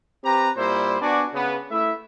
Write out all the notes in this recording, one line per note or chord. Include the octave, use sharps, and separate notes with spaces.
C4 G4 B4 A#5
A#2 G3 E4 C5
B3 D4 F#4 D5 G#5
C#3 B3
A3 E4 E5